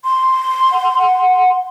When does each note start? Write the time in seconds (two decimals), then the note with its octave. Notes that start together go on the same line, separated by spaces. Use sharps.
0.05 C6
0.72 F#5